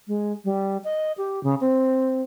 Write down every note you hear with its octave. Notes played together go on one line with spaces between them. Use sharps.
G#3
G3
D#5
G4
C#3
C4